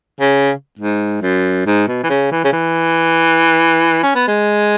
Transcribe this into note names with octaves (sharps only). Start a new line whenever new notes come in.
C#3
G#2
F#2
G#2
B2
E3
C#3
E3
C#3
E3
C#4
B3
G#3